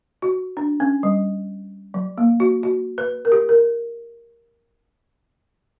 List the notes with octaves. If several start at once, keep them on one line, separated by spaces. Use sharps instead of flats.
F#4
D4
C#4
G3
F#3
A#3
F#4
F#4
B4
A#4
G4
A#4